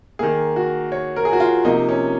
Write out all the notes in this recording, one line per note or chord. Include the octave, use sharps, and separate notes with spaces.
D#3 A#3 G#4
F#4
C#5
A#4
G#4
F#4
F4
C3 F3 A#3 D#4
C#4